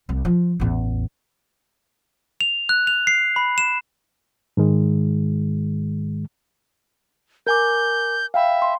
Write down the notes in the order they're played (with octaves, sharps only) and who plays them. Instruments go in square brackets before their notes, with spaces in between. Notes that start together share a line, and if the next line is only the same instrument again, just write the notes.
[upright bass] C2
F3
A1 E2
[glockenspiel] F7
F#6
F7
C7
B5
E7
[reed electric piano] G#2 D#3 G#3
[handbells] A#4 G#5 D6 [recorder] G6
[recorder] E5 [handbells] F5 G5 B5
[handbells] C6